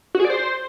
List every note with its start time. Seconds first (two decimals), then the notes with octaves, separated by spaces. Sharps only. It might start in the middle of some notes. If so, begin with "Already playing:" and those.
0.15 F#4
0.20 G#4
0.25 D5
0.30 C5